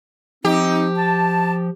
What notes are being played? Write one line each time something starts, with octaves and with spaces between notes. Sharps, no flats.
F3 C4 D#4 G4
A5